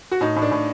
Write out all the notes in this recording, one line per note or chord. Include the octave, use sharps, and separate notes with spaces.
F#4
A2 D#4
A2
D4
A2